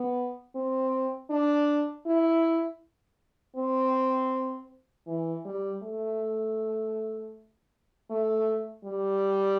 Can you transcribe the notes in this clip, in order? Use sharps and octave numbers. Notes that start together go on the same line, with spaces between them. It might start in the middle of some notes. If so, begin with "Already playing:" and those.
Already playing: B3
C4
D4
E4
C4
E3
G3
A3
A3
G3